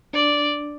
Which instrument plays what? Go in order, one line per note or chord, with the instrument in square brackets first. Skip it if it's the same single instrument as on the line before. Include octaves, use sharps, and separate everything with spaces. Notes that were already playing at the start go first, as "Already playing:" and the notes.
[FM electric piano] D4 [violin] D5